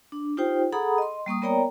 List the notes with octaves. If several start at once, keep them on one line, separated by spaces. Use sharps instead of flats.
D4
D#4 F4 G4 C5 G5
G#4 A4 F#5 A#5 B5 D#6
D#5 C6
G3 A#3 C#6 D#6
B3 A#4 C#5 D5 G5 A#5